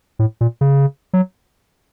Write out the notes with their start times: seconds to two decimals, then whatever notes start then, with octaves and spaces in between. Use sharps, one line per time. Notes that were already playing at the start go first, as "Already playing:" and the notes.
0.19 A2
0.41 A#2
0.61 C#3
1.13 F#3